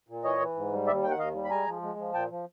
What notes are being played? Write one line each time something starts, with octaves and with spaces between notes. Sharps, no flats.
A#2
E3 C#5 D#5
E3
G#2
G3
D#2 D5 E5
D#3 G5
F#5
D#2 D#5 F5
G3
B5
G#3 G#5 A#5
F3
G#3
F3
A#2 G5 A5
F3